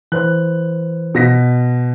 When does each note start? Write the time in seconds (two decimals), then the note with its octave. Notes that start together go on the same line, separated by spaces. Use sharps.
0.12 E3 B4 C5 F#6
1.15 B2 A#6 B6